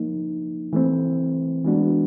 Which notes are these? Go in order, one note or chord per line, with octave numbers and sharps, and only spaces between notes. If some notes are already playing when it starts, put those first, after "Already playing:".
Already playing: F3 A#3 D#4
E3 A3 C4
E3 G#3 B3 D4 F#4